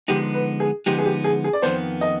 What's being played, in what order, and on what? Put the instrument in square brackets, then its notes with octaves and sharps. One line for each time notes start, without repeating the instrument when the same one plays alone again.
[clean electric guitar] D3 F3 G#3 B3 D#4 [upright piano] G4
[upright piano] B4
G#4
[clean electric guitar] D3 F3 G#3 B3 D#4 [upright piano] G4
[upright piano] G#4
G4
G#4
G#4
D5
[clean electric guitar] F2 D#3 B3 [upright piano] C5
[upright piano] D#5